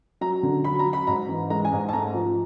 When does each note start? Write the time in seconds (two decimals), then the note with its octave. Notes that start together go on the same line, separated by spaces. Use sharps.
0.21 F#3 A#5
0.43 D3
0.64 F#3 B5
0.79 A#5
0.86 F#3
0.93 B5
1.07 G#2 A#5
1.29 E3
1.50 G#3 A#5
1.65 G#5
1.72 G#2
1.79 G#5
1.89 A5
1.93 A3 A#5
2.14 F3